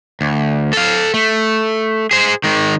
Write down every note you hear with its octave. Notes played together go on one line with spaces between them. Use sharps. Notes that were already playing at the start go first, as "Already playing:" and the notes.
D2
A4 F5
A3
G#4 C5
D#3 G#3